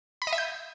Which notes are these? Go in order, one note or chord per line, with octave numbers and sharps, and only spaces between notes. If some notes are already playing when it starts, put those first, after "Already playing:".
B5
D#5
E5
G6